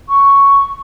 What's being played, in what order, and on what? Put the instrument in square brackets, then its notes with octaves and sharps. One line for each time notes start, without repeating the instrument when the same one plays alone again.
[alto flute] C#6